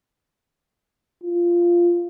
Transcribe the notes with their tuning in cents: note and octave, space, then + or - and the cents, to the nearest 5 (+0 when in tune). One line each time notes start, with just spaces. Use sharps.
F4 -10